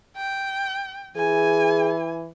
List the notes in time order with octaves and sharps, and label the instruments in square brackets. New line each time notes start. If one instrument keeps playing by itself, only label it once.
[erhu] G5
[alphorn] E3 [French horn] G#4 [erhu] G#5